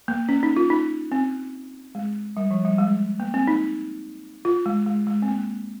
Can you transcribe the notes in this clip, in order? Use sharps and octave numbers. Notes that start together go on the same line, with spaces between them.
A#3
C#4
D#4
F4
D#4
C4
G#3
G3
F3
G3
G#3
A#3
C4
D#4
F4
G#3
G#3
G#3
C4
A#3